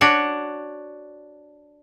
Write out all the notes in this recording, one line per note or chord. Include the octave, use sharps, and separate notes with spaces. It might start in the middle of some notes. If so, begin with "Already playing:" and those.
D4 F#4 C#5